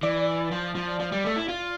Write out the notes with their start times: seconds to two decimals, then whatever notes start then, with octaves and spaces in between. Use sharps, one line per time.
0.03 E3 D5
0.52 F3
0.75 F3
1.00 F3
1.12 G3
1.24 A3
1.36 E4
1.48 F4